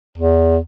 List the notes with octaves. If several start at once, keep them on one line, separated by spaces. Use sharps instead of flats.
E2